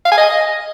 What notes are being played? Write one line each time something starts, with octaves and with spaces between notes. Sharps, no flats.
F5
G#5
D#5